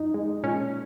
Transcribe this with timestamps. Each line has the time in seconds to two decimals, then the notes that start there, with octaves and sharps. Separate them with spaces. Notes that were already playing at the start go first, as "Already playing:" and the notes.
Already playing: F#2 D#4
0.14 G#3
0.43 A#2 C#4